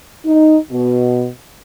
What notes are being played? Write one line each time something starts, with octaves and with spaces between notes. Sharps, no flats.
D#4
B2